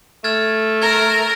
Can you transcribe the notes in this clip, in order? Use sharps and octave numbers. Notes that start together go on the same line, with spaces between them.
A3 F6 G#6 A6
A#4 G#6